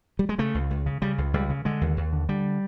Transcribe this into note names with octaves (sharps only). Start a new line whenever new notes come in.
G3
G#3
C#3 A3
C#2
C#2
C#3
C#3 G3
C#2
C#2 G3
C#3
D3 G#3
D#2
D#2
D3
D3 G3